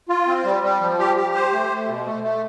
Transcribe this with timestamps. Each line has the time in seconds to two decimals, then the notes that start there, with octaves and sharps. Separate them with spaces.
0.09 F4
0.27 C4
0.45 G3
0.63 G3
0.81 F3
0.99 G4
1.17 G4
1.35 C5
1.53 A3
1.71 A3
1.88 B2
2.06 A3
2.24 A3